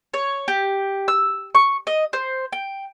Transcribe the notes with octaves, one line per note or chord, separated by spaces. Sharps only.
C#5
G4
E6
C#6
D#5
C5
G5